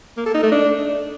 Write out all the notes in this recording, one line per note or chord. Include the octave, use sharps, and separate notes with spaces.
A#3
A4
D#4
A3
D4